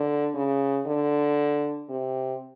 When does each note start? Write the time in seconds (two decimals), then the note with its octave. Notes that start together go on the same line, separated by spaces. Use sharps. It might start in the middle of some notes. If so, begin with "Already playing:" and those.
Already playing: D3
0.34 C#3
0.86 D3
1.89 C3